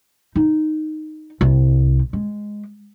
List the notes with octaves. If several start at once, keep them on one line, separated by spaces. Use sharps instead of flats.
D#4
C2
G#3